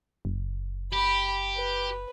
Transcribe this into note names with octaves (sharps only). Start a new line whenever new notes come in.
F#1
G4 B5
B4